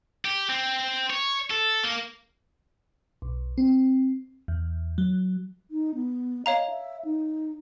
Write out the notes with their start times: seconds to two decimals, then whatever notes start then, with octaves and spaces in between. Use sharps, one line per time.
0.25 G4
0.49 C4
1.10 C#5
1.50 A4
1.83 A#3
3.22 B1
3.58 C4
4.48 E2
4.98 F#3
5.71 D#4
5.95 B3
6.46 C#5 D#5 F5 A#5
6.70 E5
7.05 D#4